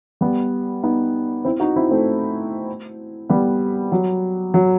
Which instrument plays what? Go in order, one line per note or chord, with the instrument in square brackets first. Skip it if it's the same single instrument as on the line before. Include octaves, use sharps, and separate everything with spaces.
[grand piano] G3 B3
B3 D#4
C4 E4
D#4 F#4
C4 E4
A3 C4
G3 B3
F#3
F#3